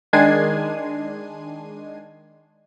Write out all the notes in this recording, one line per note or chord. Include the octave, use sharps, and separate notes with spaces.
D#3 G#3 D4 G#6 C7 D#7